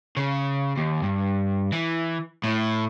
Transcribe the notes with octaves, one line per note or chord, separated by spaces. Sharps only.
C#3
D#2
G2
E3
A2